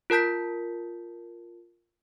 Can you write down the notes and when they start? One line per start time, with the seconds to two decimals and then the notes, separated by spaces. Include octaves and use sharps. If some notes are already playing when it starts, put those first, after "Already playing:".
0.10 F4 A#4 A5 G6 B6